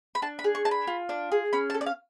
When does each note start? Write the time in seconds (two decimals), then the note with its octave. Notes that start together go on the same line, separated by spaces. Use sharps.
0.15 B5
0.22 D4 A5
0.39 B5
0.44 G#4
0.55 C#6
0.65 D4 A5
0.71 B5
0.87 F4
1.09 D4
1.32 G#4
1.53 C#4 B5
1.70 A5
1.74 A4
1.81 D5
1.86 F5